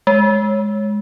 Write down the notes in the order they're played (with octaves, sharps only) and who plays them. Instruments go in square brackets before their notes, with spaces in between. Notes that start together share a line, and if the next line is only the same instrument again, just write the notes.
[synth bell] G#3